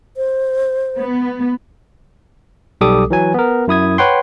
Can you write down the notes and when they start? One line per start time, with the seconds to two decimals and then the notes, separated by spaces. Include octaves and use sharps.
0.17 C5
0.97 B3
2.81 B1 G3 G4 A4 D6 D#6
3.10 E3 F#3 G#5
3.34 B3 A#4
3.68 F#2 E4 D#6 G#6
3.98 B4 C#5 F#5 G5 C6